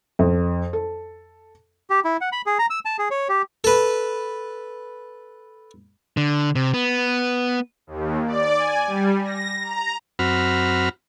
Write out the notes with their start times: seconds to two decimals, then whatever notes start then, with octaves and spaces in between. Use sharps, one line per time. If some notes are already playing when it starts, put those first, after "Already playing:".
0.19 F2
0.73 A4
1.90 G4
2.05 E4
2.21 F#5
2.32 B5
2.46 G#4
2.59 A#5
2.70 E6
2.85 A5
2.99 G#4
3.11 C#5
3.29 G4
3.64 A4 B4
6.17 D3
6.55 C3
6.74 B3
7.87 D#2
8.26 D5
8.58 G#5
8.87 G3
9.24 A#6
9.62 A#5
10.19 F#2 C4 F#4 B5 F6